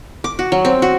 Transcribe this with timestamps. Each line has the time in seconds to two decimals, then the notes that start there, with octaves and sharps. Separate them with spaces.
0.24 D6
0.39 F#4
0.52 F#3
0.65 C4
0.82 F#4